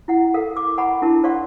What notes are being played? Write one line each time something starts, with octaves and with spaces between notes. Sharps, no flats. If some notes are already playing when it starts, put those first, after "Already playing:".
E4 F#5
A4 A#4 F5
A#4 D6
F#5 G#5 A#5 B5 C#6
D4 E4 A#4 A5
C5 D5 F5 F#5 C6 C#6